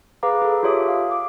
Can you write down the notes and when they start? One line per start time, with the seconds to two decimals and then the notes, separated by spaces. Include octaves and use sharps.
0.23 G#4 B4 F5 A#5 D6
0.42 G#4 A4
0.63 F4 G4 A4 C#5 E5 D#6
0.88 F5
1.11 D6